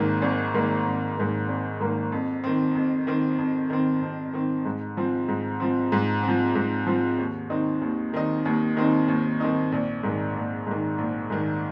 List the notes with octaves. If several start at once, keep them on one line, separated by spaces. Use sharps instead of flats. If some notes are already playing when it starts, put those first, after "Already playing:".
Already playing: G#1 G#2 D#3 A#3
G#1
G#2 D#3 A#3
G#1
G#2 D#3 A#3
G#1
G#2 D#3 A#3
F2
D#3 C4
F2
D#3 C4
F2
D#3 C4
F2
D#3 C4
G#2
F3 C4
G#2
F3 C4
G#2
C4
F3
G#2
F3 C4
D#2
D#3 C4 D#4
D#2
D#3 C4 D#4
D#2
D#3 C4 D#4
D#2
D#3 C4 D#4
A#1
G#2 D#3
A#1
G#2 D#3
A#1
G#2 D#3